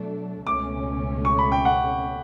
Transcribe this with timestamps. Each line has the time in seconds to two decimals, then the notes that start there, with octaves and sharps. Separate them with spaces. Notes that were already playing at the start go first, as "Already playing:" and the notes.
Already playing: B2 F#3 A3 D4
0.46 C#2 B2 A3 C#4 D6
1.25 C#6
1.39 B5
1.52 G5
1.65 F#5